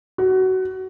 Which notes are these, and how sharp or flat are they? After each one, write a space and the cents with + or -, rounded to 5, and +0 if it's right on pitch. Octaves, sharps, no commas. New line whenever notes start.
F#4 +20